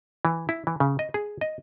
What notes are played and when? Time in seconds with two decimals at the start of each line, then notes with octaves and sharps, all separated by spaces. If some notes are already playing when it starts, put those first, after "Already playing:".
0.25 E3
0.49 E4
0.67 E3
0.80 C#3
0.99 D#5
1.14 G#4
1.41 D#5